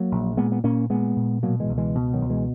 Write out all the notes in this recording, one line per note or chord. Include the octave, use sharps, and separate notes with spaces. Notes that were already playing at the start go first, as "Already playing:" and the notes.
Already playing: F#3 A#3
A#1
A#2 G#3 B3
B3
A#2 A#3 C#4
A#2 G#3 B3
A#2
B2 F#3 A#3
E3 G#3
C#2
E3 G#3
B2
D#3 F#3
C#2
E3 G#3